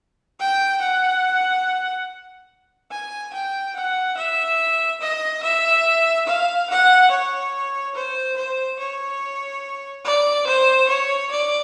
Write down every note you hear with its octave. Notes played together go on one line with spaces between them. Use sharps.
G5
F#5
G#5
G5
F#5
E5
D#5
E5
F5
F#5
C#5
C5
C5
C#5
D5
C5
C#5
D5